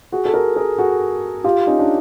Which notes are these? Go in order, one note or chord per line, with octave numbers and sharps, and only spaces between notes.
F#4 G#4
A4
G#4 A#4
G#4 A#4
F#4 G#4
F4 G4
C#4 D#4
D4